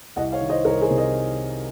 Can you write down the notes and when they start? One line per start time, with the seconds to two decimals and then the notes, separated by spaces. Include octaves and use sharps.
0.16 C2 D#5 F#5
0.32 C#5 F5
0.41 D#3
0.49 C5 D#5
0.65 C2 A#4 C#5
0.81 G#4 C5
0.90 C3
0.98 C5 D#5